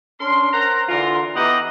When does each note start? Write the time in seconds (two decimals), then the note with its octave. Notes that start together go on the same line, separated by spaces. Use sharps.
0.20 C#4 D4 A#4 C6
0.53 A#4 C5 F#5 A#5
0.89 D3 E3 F4 A#4 C6
1.36 E3 B3 G4 D#5 F#5 A#5